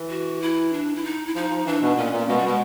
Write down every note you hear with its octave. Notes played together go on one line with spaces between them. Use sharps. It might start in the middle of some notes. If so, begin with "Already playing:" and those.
Already playing: E3
F#4
E4
D4
E4
D#4
E4
F3 D#4
F3
E3 D4
B2
A#2 C#4
A#2
B2 G#3
G3
B2 G#3